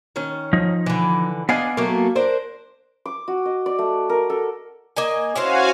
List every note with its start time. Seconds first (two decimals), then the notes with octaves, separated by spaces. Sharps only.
0.16 D#3 C#4
0.53 F3 D#4
0.86 D3 E3
1.49 B3 D4 D5 D#5 F5 G#5
1.77 F#3 A3 A#3
2.15 D4 A#4 C5
3.06 D6
3.28 F#4
3.45 D#5
3.66 D5
3.79 A3
4.10 A#4
4.30 A4
4.97 A#3 D#5 G#5
5.36 C#4 E4 F#4 C5 F5 G#5